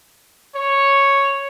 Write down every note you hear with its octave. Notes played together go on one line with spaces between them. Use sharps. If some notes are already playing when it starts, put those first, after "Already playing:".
C#5